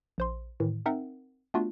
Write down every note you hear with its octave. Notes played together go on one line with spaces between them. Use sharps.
A#1 C5 C6
A2 D#3 E3
C4 D#4 A#4 E5 F#5
A3 B3 D4 F4 F#4